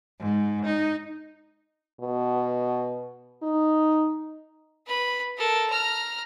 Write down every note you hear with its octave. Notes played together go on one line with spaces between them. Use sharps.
G#2
D#4
B2
D#4
B4 B5
A4 A#4
A#5 F6